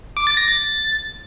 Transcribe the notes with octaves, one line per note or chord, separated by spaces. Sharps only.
D6
A6
A#6
A6